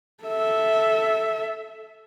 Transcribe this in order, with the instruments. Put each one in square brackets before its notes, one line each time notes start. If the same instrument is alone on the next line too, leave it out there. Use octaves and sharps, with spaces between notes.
[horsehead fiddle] A4 E5